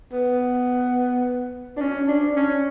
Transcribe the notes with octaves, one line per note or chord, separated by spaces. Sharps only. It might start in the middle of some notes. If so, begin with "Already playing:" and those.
B3
D4
C#4
D4
C#4